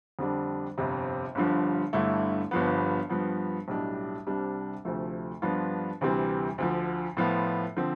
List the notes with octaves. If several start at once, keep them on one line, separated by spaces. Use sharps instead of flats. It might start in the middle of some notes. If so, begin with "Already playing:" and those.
F2 D3 G3 D4
G1 F2 C3
G1 G2 D3 F3
G1 G2 D3 A3 E4
G1 G2 F3 B3
G2 F3 B3
B1 A2 G3 D4 G4
C2 C3 G3 D4
D2 C3 F3 A3
G2 F3 B3 D4 F4
D2 C3 E3 G3 C4
D2 D3 F3
A2 F3 B3 F4
D3 F3 C4